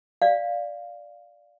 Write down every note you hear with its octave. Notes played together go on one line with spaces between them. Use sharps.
D5 F5